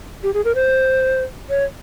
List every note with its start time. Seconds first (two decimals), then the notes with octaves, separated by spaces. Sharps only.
0.23 G4
0.34 G#4
0.45 A#4
0.55 C5
1.50 C#5